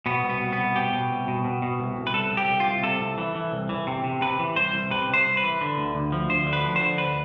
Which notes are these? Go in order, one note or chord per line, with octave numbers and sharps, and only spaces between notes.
B2 B3
C2
B3
B2
B3
C2
B2 G4
B2
C2
B2
B2
B2
C2
C2
B4
C2 A4
C2
G4
C2
F4
C2
C3 A4
C2
E3
E3
C2
E3
C3
C3
C3 B4
E3
C2 C5
C2
C3 B4
C2 C5
C2
B4
E3
D3
D2
D2
F3
D2 C5
D3
B4
F3
C5
D3
D2 B4